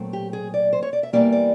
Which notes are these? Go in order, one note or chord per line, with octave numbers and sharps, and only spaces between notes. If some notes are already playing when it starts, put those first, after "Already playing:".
Already playing: A#2 F#3 A3 C4
G4
G#4
D5
C5
C#5
D5
E5
E2 C#3 E3 G3 A#3 D5
D5